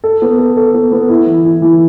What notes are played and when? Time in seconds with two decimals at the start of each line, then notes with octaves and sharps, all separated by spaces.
0.04 A4
0.22 B3
0.39 A4
0.57 A4
0.74 B3
0.92 B3
1.09 E4
1.27 E3
1.45 E4
1.62 E3